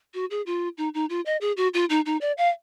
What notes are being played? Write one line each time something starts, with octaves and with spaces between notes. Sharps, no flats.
F#4
G#4
F4
D#4
D#4
F4
D#5
G#4
F#4
F4
D#4
D#4
D5
F5